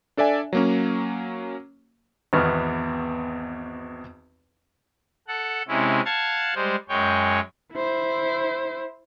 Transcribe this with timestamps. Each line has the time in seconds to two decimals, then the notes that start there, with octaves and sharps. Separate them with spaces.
0.17 D4 A4 D5 E5 G#5
0.53 F#3 A#3 C#4
2.33 G#1 E2 B3 C#6 F6
5.28 A4 F#5
5.68 C3 G#3 C#4 E4
6.05 F5 F#5 A5 G#6
6.55 G3 G#3 C5
6.89 F#2 G#3 C#5 G5
7.74 E4 C5